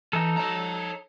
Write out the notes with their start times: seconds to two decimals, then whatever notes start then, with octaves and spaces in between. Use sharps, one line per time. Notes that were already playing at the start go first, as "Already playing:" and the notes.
0.13 E3 D#4 A4
0.37 C#5 A#5